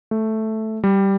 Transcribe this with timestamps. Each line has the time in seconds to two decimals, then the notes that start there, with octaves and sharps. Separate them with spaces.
0.11 A3
0.84 G3